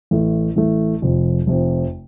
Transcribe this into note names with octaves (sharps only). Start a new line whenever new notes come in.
A1 A2 A3
A1 A2 A3
F1 F2 C3 F3
F1 F2 C3 F3